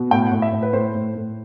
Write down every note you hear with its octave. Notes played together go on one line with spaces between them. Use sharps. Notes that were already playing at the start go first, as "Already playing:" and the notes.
Already playing: B2
A2 G5
F#5
A2
E5
A2
B4
A2 C5
A2
A2